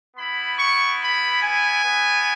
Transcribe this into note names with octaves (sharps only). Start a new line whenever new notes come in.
B3 E4 B5
C#6
B5
G#5
B3 E4